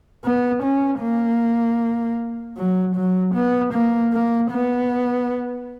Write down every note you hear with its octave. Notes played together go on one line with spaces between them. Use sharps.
B3
C#4
A#3
F#3
F#3
B3
A#3
A#3
B3